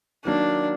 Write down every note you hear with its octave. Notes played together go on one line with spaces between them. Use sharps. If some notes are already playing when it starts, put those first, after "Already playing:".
D#3 F#3 A#3 D4